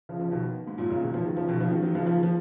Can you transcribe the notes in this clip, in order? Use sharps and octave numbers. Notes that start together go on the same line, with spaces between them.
C#3 F3
C#3 F3
B2 D#3
G#2
F#2 A#2
A#2 C#3
B2 D#3
C#3 F3
D#3 F#3
C#3 F3
B2 D#3
C#3 F3
D#3 F#3
D#3 F#3
C#3 F3
C#3 F3
F3